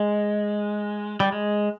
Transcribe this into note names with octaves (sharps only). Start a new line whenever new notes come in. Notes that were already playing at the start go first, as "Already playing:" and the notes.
Already playing: G#3
G3
G#3